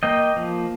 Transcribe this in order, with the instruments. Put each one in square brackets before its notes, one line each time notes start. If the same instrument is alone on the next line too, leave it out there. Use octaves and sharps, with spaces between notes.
[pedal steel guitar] A#3 D#5 G5
F3